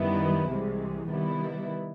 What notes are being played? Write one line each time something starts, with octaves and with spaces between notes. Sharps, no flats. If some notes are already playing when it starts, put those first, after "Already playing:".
Already playing: F#2 D#3 G3 B3 E4
C2 C3 E3 G#3
C3 D#3 G3 B3 E4